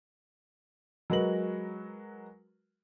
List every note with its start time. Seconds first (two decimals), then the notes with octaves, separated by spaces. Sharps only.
1.10 F#3 G#3 F#4 A#4 B4 F#7